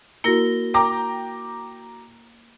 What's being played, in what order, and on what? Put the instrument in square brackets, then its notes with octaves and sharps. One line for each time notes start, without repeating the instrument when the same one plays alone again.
[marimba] A#3 E4 A#4 [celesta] F#4 A#6 G7
[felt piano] G5 A#5 D6